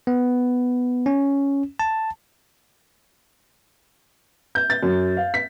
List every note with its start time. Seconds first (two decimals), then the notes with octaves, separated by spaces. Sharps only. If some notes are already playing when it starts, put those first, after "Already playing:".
0.07 B3
1.06 C#4
1.79 A5
4.55 G6
4.70 A6
4.83 F#2
5.17 F5
5.34 B6